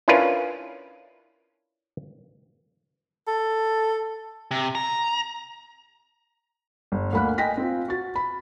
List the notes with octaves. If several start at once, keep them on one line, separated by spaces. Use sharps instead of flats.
C#4 D4 E4 F4 A#4 B4
A4
C3
A#5
G1
D2 A#3 B5 F6 F#6
D#5 G5 G#5 A#6 B6
C4 F4
F#4 A6
B5